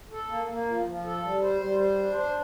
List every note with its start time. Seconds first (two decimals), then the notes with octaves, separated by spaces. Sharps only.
0.11 A4
0.29 A#3
0.48 A#3
0.67 F3
0.86 F3
1.05 A4
1.23 G3
1.42 C5
1.61 G3
1.79 C5
1.98 D4
2.17 C5